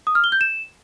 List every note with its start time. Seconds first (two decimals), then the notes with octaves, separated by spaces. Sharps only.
0.07 D#6
0.15 F6
0.24 G7
0.32 G6
0.41 E7